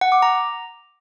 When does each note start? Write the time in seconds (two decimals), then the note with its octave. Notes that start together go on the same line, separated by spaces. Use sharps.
0.01 F#5
0.12 D6
0.22 A#5